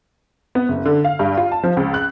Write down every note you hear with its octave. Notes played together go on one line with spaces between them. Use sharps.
B3
F#1
D3
F5
G2
F4
A5
F3
C#2
F#6